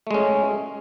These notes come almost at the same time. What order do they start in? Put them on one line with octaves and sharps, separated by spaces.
A3 G#3 C#4